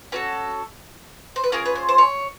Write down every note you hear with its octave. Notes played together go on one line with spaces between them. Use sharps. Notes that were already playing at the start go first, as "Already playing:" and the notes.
C#4 F#4 A4 B4
C5
B4
C#4 F4 G#4 A#4
B4
C5
C5
C#5